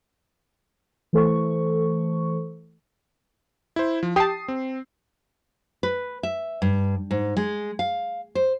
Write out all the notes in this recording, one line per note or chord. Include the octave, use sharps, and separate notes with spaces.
E3 A3 A4 C5 C#6
E4 C5
F3
G4 A5 D#6 C7
C4
B4
E5
G2
G#2
G#3
F5
C5